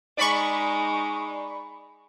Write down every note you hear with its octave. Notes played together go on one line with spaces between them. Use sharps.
G#3 D#4 D5 B5 C#6